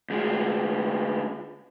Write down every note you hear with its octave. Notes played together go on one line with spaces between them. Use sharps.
D2 G#3